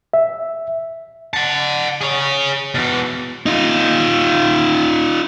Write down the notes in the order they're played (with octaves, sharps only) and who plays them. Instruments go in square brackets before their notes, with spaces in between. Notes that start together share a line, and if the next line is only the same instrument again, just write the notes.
[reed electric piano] E5
[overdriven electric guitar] F#5 A5
G#4 C#5
B2 E3
[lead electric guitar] D#4 F4